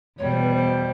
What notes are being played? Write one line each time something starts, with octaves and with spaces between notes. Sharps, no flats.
E2 B2 G3 C#5
C5
B4
C5